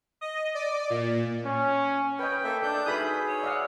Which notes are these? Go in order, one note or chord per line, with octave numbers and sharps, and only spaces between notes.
D#5
D5
A#2
C#4
C#4 B4 D#5 G5 G6
A#3 A4 E5
D4 A4 G6
D#4 F#4 G#4 B4 E5 B5 D#6
C#5
D5 D#5 F5 F#5 D6 E6